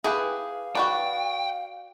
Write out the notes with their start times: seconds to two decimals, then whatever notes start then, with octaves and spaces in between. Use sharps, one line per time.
0.04 E4 G4 G#4 B4 F5
0.75 F#4 B4 D5 G5